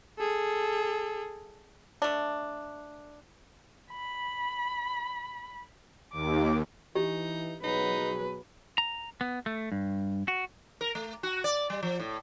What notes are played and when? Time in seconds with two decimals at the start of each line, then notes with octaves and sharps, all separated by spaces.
0.18 G#4 A4
2.02 A3 D4
3.92 B5
6.13 D#2 D6
6.95 E3 D#4 G4
7.63 B2 F#3 D#4 G#4 B4
8.78 A#5
9.21 B3
9.46 A3
9.72 G2
10.28 F#4
10.81 A#4
10.95 A3
11.23 F#4
11.44 D5
11.70 G3
11.83 F3
11.99 A2